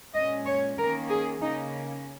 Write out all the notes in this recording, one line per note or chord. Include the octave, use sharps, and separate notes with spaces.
A#2 G#3 C#4 D#5
C#5
D#3 A#3 C#4 A#4
G#4
C#3 A#3 C#4 D#4